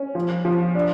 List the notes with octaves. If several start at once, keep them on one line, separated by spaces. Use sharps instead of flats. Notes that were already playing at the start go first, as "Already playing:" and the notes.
Already playing: C#4
F3
F3
D4